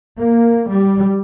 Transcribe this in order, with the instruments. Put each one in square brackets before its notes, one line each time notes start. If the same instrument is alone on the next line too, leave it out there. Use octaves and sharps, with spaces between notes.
[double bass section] A#3
G3